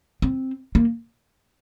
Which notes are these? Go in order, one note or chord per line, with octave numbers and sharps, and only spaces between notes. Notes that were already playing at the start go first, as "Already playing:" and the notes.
C4
A#3